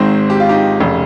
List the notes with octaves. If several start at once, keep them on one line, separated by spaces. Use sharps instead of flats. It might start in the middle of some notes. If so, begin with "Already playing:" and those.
Already playing: G#1 G#2 D#3 C4 D#4
G4
F4
D#4 G4
F1 C#3